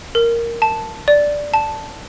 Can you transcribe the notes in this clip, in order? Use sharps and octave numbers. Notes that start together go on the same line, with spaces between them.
A#4
A5
D5
A5